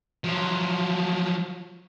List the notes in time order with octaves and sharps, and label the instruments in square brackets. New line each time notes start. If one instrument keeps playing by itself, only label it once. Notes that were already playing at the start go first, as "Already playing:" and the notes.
[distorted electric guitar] F3 F#3